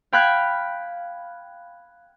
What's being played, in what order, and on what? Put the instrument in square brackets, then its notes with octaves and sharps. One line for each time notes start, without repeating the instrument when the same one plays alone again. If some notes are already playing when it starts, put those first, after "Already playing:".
[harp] F5 G5 B5 F6 F#6 G#6